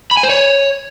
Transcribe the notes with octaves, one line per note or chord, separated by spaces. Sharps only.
B5
G#5
C5
C#5